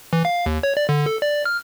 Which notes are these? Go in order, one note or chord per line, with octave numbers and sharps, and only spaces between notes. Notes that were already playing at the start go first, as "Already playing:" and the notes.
E3
F5
D#2
C#5
D5
D3
A4
D5
F6